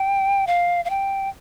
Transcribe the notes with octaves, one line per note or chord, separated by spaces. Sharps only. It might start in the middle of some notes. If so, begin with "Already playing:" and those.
Already playing: G5
F5
F5
G5